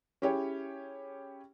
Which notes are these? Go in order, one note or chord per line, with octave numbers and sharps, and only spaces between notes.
C#4 E4 G4 G#4 C#5